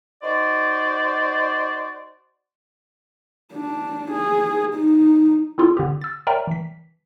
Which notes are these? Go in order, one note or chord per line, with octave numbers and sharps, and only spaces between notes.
D#4 F#4 C5 D5
D4
G#4
D#4
C4 E4 F4 G#4 A4
D3 C4 G4
E6 A6
A#4 C#5 D5 E5 G5 A#5
E3 B6